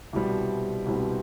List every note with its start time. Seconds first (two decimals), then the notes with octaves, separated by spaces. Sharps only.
0.13 C2 B2 G3 C4
0.86 C2 B2 G3 C4